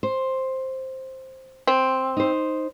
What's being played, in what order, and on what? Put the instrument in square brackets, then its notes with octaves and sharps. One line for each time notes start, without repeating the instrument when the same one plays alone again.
[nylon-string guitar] C5
[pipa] C4
[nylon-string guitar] D#4 C5